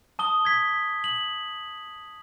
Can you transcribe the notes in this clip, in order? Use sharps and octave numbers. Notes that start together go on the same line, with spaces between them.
A5 D#6 G7
G#6 B6
F#7